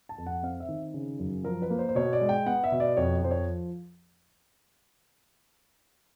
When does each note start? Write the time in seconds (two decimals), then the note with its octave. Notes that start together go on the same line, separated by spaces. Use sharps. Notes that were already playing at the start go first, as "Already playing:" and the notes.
0.09 A5
0.18 F2
0.26 F#5
0.43 C4 F5
0.60 E5
0.68 D#3
0.94 C#3
1.19 F#2
1.44 F3 A#4
1.62 B4
1.70 A#3
1.79 C5
1.89 C5
1.95 B2 C#5
2.13 D5
2.21 G#3
2.29 G5
2.46 B3 F#5
2.64 E5
2.72 B2
2.80 D5
2.97 F2 C#5
3.23 F3 C5
3.31 C#5